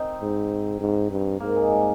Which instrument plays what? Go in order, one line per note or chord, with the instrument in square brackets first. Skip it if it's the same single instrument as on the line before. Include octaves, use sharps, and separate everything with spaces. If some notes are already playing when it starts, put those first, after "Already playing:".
Already playing: [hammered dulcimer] C4 D#4
[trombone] G#2
G#2
G2
[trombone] G#2 [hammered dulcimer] A#3
[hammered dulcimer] G#3
G3